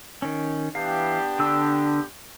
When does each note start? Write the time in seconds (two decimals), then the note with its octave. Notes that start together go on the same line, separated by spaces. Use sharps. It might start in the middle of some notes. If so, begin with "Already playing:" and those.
0.22 D#3 C#4
0.75 E3 B3 D4 G4 F5
1.39 D3 E6